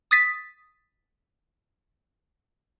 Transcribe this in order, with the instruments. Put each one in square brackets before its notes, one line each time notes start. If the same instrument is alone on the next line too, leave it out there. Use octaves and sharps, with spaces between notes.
[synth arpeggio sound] D#6 A6 B6